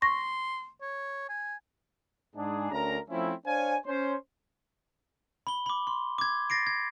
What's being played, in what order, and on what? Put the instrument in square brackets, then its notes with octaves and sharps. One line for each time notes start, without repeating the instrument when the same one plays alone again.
[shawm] C6 [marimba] C#6 A#6
[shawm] C#5
G#5
[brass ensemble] G#2 D4 G#4
D2 C#4 A#4 A#5
F3 A3 C4 C#4 E4
D4 C5 C#5 F5 G#5
C#4 C5
[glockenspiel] B5 G7
B5 D6
C6
D6 G#6
A6 A#6 C7 D7
G#6